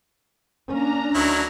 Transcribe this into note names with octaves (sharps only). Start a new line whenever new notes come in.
A#3 C#4 D4 A#5
D2 D#3 F#3 E4